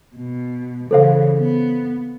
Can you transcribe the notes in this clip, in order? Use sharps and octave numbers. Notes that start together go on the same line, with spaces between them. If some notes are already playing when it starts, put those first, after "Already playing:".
B2
C#3 E3 A4 C5 F5
B3